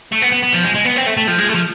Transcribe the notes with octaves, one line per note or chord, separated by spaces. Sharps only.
A3
B3
B3
B3
F3
G#3
G#3
B3
C4
A3
A3
F3
G#3
A3
F3